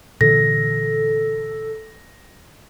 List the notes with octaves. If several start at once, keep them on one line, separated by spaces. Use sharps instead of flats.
A#2 D3 E3 A4 A#6